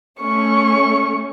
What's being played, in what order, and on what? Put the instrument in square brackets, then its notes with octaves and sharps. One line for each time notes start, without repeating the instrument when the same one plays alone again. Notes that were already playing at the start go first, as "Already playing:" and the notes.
[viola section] A3 C#4 [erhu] C#6